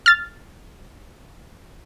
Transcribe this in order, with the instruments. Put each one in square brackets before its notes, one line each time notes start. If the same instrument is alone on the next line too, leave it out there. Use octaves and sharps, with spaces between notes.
[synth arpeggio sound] F6 A6